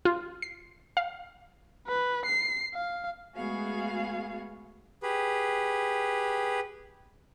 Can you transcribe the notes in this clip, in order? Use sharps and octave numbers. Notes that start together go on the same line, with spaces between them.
F4
C7
F5
B4
C7
F5
G#3 A3 B3 F#4 G#4 F5
G4 G#4 B4